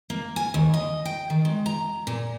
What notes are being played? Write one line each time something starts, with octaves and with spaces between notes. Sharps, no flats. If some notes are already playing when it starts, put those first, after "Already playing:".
A#3
G#5
D#2
D#5
G5
D#3
G#3
A#5
A#2